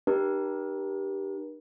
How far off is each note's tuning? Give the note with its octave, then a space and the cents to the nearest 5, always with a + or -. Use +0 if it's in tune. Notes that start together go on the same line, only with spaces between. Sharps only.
D#4 -45 G4 +0 A#4 +40